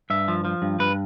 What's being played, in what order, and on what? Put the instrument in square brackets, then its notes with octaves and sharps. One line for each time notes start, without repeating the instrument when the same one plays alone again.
[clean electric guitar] G2 E5
F3
F3
G2
G2 B4